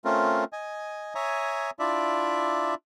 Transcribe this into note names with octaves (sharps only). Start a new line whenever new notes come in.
A3 C4 C#4 F4 A#4
D#5 G#5
C#5 E5 G#5 A#5 D#6
D4 E4 F4 D5 E5